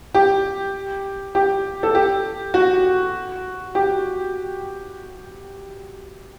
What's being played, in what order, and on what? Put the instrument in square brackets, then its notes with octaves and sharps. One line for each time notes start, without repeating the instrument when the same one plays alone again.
[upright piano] G4
G4
A4
G4
F#4
G4